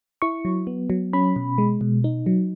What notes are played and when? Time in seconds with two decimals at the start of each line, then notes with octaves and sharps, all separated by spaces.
0.22 E4 C#6
0.45 F#3
0.67 B3
0.90 F#3
1.13 C#4 B5
1.36 B2
1.58 G#3
1.81 B2
2.04 D#4
2.26 F#3